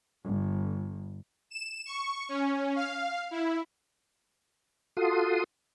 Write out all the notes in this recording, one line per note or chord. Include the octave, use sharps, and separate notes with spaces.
G1
E7
C#6
C#4
F5
E4
F4 F#4 A4 C6 D#6